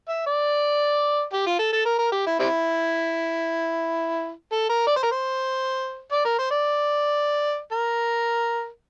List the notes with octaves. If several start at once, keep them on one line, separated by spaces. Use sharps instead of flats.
E5
D5
G4
F4
A4
A4
A#4
A#4
G4
E4
G3 C4 E4
A4
A#4
D5
C5
A#4
C5
D5
A#4
C5
D5
A#4